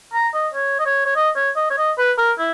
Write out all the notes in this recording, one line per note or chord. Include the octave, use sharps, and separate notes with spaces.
A#5
D#5
C#5
D#5
C#5
C#5
D#5
C#5
D#5
C#5
D#5
B4
A#4
E4